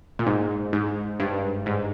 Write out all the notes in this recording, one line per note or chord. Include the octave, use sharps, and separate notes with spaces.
A#2
G#2
G#2
G2
G#2